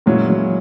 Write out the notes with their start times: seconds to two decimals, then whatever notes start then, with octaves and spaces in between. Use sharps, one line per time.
0.06 A#2 F#3 G#3 C#4 E4
0.30 F#3